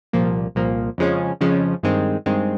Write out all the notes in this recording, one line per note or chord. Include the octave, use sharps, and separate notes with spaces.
C2 A#2 F3 A#3
C2 A#2 F3 A#3
F2 C#3 F3 G#3 C#4
F2 C#3 F3 G#3 C#4
G2 D#3 G#3 C4
G2 D#3 G#3 C4